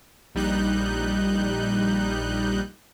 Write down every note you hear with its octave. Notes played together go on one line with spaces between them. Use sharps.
A#1 G3 D#4 F#6 G6